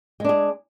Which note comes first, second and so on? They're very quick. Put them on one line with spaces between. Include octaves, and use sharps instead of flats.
G#3 D4 G#4